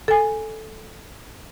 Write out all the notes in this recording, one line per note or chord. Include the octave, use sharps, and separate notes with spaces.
A4 G#5